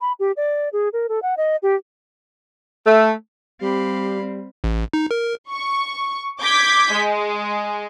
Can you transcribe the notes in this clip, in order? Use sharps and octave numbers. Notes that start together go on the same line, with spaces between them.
B5
G4
D5
G#4
A#4
A4
F#5
D#5
G4
A3
G3 C4 G4 F5 B5
A1
D#4
A#4
C#6
D6 G6 G#6 B6
G#3